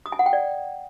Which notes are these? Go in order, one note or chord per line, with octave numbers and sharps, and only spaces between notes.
D#6
G#5
F#5
G5
D5